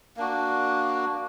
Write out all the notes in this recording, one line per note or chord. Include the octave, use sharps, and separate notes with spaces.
A#3 D4 F#4